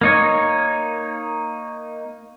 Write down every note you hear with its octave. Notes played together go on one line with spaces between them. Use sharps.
A#3 D#4 C#5